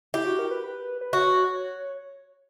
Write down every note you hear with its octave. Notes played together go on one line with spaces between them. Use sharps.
E4 G4
F#4
A#4
B4
B4
B4
F#4 C#5